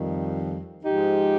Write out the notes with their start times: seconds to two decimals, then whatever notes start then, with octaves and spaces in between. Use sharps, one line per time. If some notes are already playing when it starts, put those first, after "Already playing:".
Already playing: F2 D#3 G3
0.85 G#2 F3 G#3 D#4 G4